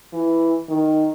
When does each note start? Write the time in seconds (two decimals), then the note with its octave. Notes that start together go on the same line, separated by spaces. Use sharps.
0.13 E3
0.69 D#3